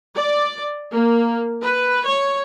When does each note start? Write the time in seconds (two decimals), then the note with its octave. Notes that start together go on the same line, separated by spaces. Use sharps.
0.17 D5
0.91 A#3
1.62 B4
2.05 C#5